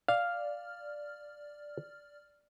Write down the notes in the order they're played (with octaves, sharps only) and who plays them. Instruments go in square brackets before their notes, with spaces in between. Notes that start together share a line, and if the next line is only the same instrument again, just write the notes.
[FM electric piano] D5 F6 [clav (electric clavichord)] F5